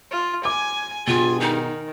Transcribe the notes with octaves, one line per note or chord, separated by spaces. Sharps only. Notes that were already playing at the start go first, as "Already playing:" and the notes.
F4
G#5 D6
G2 B2 F4 G#4 G5 G#5
D#3 D#4